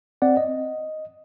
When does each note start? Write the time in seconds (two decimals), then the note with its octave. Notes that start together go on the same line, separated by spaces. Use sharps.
0.22 C4 D5 F#5
0.37 D#5